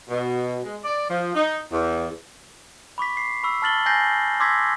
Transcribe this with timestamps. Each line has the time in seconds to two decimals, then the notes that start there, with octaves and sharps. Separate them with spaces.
0.09 B2
0.63 G#3
0.84 D5
1.10 F3
1.35 D#4
1.71 E2
2.98 B5 C#6 D6 B6
3.17 C7
3.44 B5 C#6 E6
3.62 A5 F6 A6 F#7 G7
3.86 G#5 G6 A6 A#6 C7
4.40 C6 D6 E6 G#6 A#6 B6